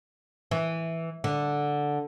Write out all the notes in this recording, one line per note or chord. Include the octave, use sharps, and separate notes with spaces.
E3
D3